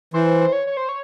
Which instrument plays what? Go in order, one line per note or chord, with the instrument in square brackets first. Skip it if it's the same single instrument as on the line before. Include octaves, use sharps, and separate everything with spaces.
[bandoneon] E3 [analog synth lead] C5
[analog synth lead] C5
C5
C#5
C#5
C5
C#5